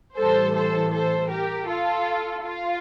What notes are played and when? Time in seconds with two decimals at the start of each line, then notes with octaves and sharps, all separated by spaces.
0.18 A2 E3 G3 A4 C5
0.55 A4 C5
0.93 A4 C5
1.31 G4 A#4
1.68 F4 A4
2.44 F4